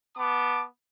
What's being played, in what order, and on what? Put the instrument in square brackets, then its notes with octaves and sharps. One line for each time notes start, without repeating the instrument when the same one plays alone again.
[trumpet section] B3 A5 D6